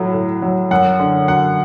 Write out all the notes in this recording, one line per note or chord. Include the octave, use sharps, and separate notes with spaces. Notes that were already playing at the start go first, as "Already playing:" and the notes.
Already playing: A2 F#3
A2
F#3
F#2 F#5
D3
F#3 F#5